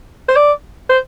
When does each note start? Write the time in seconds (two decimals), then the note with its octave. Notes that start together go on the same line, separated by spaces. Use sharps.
0.29 C5
0.36 D5
0.90 C5